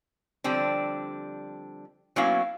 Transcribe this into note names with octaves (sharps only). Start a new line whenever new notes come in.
D3 F3 G3 C4 D4
F#3 A#3 B3 C#4 E4 F5